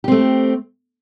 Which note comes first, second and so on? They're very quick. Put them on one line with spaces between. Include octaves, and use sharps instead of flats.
G4 C4 A3